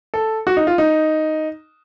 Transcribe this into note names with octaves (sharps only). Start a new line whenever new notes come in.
A4
F#4
D#4
F4
D#4